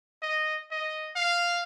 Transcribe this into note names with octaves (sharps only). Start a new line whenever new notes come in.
D#5
D#5
F5